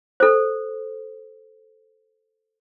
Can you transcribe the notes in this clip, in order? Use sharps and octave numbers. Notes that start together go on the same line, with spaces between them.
A4 C5